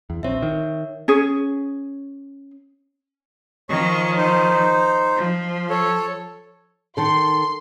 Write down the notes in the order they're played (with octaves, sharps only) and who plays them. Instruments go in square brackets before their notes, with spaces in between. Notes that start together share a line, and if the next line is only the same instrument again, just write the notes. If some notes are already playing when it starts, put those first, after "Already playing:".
[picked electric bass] E2
[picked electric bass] A#1 C4 [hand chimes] C#5 E5
[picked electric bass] D#3
[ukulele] C#4 G#4
[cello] D#3 F3 [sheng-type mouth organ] C#5 C#6
[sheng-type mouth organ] D#4 C5
[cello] F3
[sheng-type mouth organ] A4 C#5
[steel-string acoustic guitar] D#3 A4 [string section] C6